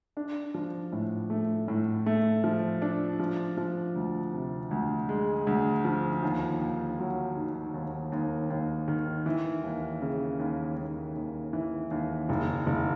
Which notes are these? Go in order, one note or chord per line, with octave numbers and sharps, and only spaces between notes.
D4
F3
A2
A3
A2
A3
F3
D4
F3
F3
D2
C3
D2
G#3
D2
F3
D#2
D#2
F#3
D#3
D#2
D#2
D#2
D#3
E3
D#2
C#3
D#2
D#2
D#2
E3
D#2
F#1
F#1